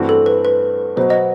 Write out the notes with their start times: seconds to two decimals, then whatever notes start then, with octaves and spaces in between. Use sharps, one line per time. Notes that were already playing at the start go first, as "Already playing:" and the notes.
Already playing: G2 E3 A3 C4 F#4
0.09 A4
0.26 B4
0.45 B4
0.96 B2 F#3 B3 C5
1.10 D#5